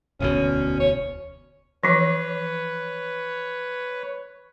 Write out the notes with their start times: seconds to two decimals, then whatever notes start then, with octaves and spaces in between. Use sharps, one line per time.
0.20 E1 D2 B2 C#4
0.80 C#5
1.83 E3 F3 B4 C#5